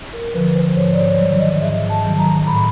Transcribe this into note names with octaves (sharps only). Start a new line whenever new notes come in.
A#4
D3 F3 B4
C5
G#2 C#5
D5
C#5
F#3 D5
D#3
D#5
G#2 E5
A5
D#3 F#3
A#5
A2 B5